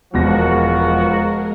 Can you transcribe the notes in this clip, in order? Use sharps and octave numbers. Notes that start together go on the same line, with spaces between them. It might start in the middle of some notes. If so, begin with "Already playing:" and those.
E1 B2 F3 G#3 B3 F#4 A#4 A#6